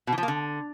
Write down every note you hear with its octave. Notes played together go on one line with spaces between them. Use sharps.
B2
E3
F3
A#3
D3